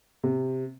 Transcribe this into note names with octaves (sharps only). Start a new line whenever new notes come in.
C3